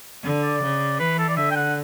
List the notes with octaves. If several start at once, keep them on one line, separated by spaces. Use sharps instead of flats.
D3
D5
C#3
E3 B4
A4
D5
D3 E5
G5
F#5